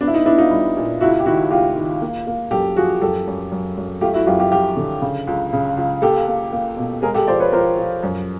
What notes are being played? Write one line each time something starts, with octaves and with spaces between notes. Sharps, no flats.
B3 D4
E4
D#4
B3 D4 E4
D#4 F4
G3
A#2
C#2 E4 F#4
G4
D#3 E4 F#4
C#2 F4 G4
D#3
A#3
A#3
F#2 G4 A4
F3 F#4 G#4
F#2 G4 A4
F#2
F#2
F#2
A3 F4 G4
E4 F#4
F#2 F4 G4
F4 G4
F3 F4 G4
D3
C#3
C#2
C#3
C#2
A#3 G4 A4
A#3
A#3
B2
G#3 G#4 A#4
G4 A4
F3 C5 D5
B4 C#5
F3 A#4 C5
F3
F#2